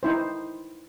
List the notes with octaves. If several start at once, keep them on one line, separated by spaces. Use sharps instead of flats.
D#4 E4 C5